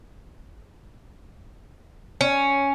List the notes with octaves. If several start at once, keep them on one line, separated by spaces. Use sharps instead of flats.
C#4